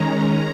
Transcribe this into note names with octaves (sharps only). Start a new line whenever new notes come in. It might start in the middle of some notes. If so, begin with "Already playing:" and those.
Already playing: D#3 G#3 C#4 A#5